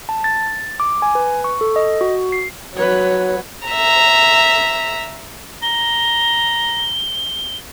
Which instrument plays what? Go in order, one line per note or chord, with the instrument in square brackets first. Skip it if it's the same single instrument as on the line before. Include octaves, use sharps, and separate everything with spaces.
[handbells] A5
A6
D6
G#5
B4
C#6
A4
D#5
F#4
C7
[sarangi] F#3 [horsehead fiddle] B4 C#5
[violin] E5 A#5
[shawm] A#5 [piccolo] G7